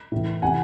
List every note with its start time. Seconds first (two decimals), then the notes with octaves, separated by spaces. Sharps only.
0.12 A2 E3
0.42 C3 E3 F#5 G#5